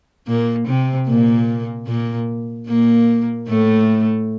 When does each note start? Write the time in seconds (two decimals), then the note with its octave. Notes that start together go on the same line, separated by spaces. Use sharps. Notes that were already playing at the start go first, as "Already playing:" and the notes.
0.28 A#2 A#3
0.67 C3 C4
1.08 A#2 A#3
1.87 A#2 A#3
2.68 A#2 A#3
3.48 A2 A3